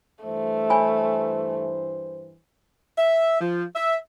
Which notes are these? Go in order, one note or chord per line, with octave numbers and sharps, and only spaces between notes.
G2 E3 A3 C5
C#5 G#5 B5
E5
F3
E5